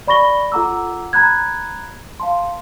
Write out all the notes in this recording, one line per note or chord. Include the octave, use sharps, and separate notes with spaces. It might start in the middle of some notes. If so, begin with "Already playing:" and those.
D5 B5 C#6 A#6 G7
F4 A4 F#5 A#5 D6 E6
A#5 B5 F#6 G#6
F5 A5 C6